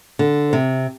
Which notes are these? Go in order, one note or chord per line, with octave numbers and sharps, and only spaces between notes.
D3
C3